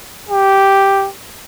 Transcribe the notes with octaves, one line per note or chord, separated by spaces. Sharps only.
G4